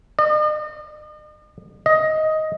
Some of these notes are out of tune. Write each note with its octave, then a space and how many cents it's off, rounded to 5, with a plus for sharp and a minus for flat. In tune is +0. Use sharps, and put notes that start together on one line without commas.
D#5 -45
D#5 +10